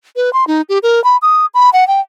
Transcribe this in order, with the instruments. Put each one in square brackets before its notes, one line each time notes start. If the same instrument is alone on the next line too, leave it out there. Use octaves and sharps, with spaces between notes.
[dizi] B4
C6
D#4
G4
A#4
B5
D#6
B5
F#5
G5